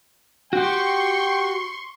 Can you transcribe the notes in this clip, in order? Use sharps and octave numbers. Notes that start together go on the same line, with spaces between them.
F#4 G4 G5 C6 C#6